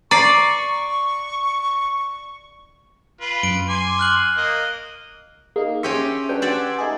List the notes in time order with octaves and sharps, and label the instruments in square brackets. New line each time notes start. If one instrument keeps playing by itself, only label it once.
[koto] D5 [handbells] A#5 C7 [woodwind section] C#6
[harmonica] F4 B4
[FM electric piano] F#2 [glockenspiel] D7
[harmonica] G#5 C6 D6
[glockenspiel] F6 F#6 F#7
[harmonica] A#3 D#5
[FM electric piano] A#3 D#4 [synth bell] G#4
[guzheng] C#4 G4 D#5 [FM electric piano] E5 C6 C#6
[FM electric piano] F#3 D4 G5 [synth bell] B4
[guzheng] G4 D5 F#5 [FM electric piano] C6 E6 G#6
[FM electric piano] A3 D#4 G#4